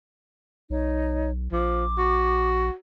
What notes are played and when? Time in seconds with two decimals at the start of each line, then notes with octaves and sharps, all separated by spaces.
0.70 B1 D#4 C#5
1.52 A#1 F3 D6
1.98 F#4